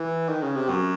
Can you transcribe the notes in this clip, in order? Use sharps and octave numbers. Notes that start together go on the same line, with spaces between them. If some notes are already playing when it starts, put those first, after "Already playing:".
Already playing: E3
D#3
C#3
C3
F#2